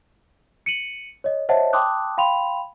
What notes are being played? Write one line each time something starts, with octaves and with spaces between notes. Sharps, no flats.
C#7 D#7 F#7
C#5 D#5
C5 C#5 D#5 E5 F#5 A5
G5 A5 C6 D6 D#6 F#6
F5 G5 B5 C6 F7